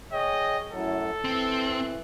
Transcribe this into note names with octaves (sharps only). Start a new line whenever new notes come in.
G#4 C#5 D#5 G5
F#2 A2 F#3 A4
E3 C4